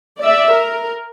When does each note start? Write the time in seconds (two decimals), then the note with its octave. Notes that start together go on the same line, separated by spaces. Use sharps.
0.20 D5 E5
0.52 A#4